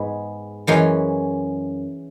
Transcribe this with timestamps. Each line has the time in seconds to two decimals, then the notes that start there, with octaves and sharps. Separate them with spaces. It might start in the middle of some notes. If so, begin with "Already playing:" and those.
Already playing: G#2 G#3 B3
0.67 F#2 E3 G#3 C#4